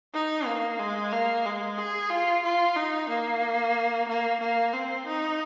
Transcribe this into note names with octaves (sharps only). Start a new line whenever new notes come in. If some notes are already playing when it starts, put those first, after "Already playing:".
D#4
A#3
G#3
A#3
G#3
G#4
F4
F4
D#4
A#3
A#3
A#3
C4
D#4